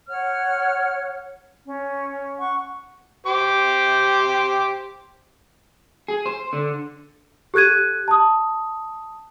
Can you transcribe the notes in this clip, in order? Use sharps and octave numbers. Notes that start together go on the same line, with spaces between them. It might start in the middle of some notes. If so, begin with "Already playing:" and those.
C#5 F#5 F6
C#4
F#5 C#6
G4 C5 D6
G#4
C5
D3
G4 A4 F#6 G#6 D#7
A5 D#6